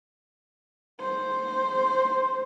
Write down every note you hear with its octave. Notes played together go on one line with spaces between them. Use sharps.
C5